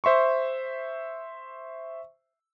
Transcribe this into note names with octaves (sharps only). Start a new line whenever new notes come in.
C5 E5 C6 C#6